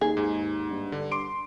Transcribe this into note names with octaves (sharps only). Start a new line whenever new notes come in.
D#2 G#4
G#2
G2
D3
C6 D6 D7